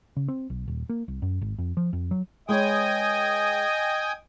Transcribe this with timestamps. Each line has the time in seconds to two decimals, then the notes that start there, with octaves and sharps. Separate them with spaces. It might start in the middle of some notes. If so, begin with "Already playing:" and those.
0.16 C#3
0.28 C4
0.50 B1
0.68 D#1
0.89 A#3
1.08 C2
1.22 F#2
1.41 G#1
1.58 F2
1.77 F3
1.93 F2
2.11 F#3
2.49 G#3 B4 C#5 D#5 G5 G#5 D#6